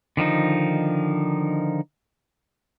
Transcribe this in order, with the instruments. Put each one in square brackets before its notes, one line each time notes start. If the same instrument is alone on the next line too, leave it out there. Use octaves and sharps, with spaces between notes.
[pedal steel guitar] D3 D#3 F3 D#4